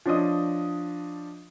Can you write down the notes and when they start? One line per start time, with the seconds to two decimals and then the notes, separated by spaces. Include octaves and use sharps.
0.06 F3 D4 C#5 D#5 D#6